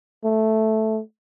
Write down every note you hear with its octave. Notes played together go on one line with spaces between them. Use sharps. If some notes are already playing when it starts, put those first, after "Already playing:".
A3